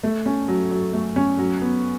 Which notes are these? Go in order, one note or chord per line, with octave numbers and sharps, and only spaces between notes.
A3
C#4
F#3
F#3
A3
C#4
F#3
B3